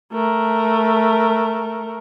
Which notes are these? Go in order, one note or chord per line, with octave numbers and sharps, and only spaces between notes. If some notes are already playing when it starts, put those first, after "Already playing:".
A3 A#4